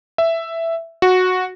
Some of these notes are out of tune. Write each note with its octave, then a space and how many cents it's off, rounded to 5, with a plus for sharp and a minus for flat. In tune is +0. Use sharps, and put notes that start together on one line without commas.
E5 +5
F#4 -10